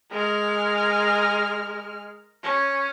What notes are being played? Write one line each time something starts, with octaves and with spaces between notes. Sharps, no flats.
G#3 A#4 F6
C#4